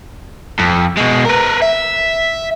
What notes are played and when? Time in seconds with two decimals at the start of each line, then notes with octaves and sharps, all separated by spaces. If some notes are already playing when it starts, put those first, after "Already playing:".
0.60 F2
0.98 B2 G#3
1.26 A#4 B4
1.62 E5